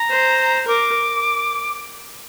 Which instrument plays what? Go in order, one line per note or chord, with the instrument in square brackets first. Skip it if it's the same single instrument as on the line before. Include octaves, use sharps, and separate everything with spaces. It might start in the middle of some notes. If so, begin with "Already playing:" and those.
Already playing: [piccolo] A#5
[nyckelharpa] C5
[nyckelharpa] A#4 [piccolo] D6